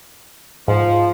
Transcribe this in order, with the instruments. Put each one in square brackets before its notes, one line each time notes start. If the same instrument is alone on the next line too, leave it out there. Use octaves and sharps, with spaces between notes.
[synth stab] G#2 [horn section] F3